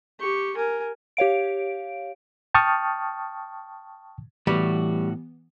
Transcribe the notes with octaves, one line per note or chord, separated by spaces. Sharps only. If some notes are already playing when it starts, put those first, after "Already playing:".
G4 C#6
A#4 G#5
G4 C#5 F5 D7
G5 A5 C#6 D#6 F6
A2 E3 G3 B3 F#4